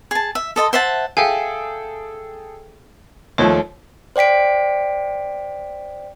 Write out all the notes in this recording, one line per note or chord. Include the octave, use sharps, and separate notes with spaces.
G#4 A5
E5
A4 D#5 A5 C6
C5 E5 F#5 A5
G#4 A4 E5 F5 G5 G#5
D#2 F3 A3 C#5
C5 D5 G5 B6 D7